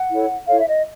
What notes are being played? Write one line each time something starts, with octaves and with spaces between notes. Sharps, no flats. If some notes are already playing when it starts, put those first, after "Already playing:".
Already playing: F#5
E4 A4 C#5
E4 A4 C#5 F5
E5
D#5